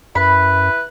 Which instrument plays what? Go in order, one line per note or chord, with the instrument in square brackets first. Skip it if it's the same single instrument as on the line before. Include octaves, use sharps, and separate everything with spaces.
[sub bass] F#2 [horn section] E4 B4 [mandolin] B5